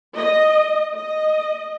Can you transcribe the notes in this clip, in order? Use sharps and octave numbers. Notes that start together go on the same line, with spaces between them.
D#5
D#5